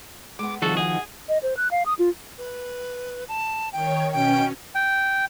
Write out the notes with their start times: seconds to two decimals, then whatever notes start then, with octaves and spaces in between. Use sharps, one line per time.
0.39 G#3 B3 D6
0.62 C2 D#3 F3 F#4 G#4 A4
0.77 D#4 F#4 G#4 G#5
1.29 D#5
1.43 C5
1.57 F#6
1.71 F5
1.86 D#6
1.99 F4
2.38 B4
3.29 A5
3.73 D#3 C#5 G5
4.12 B2 C#4 G5
4.75 G5